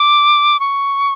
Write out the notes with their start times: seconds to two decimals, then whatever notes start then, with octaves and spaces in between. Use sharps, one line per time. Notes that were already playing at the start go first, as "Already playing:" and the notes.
Already playing: D6
0.60 C#6